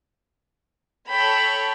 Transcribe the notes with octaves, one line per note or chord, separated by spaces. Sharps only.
A4 C#5 G5 A5 B5